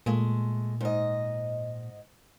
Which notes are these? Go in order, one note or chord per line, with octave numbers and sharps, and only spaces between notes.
A#2 G#3 A3
G#2 D#5